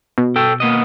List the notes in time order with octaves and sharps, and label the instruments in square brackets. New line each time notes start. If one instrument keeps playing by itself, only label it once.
[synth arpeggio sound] B2
[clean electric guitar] A4 G5
A#3 B3 D#5